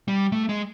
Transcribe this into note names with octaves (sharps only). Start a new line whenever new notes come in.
G3
A3
G#3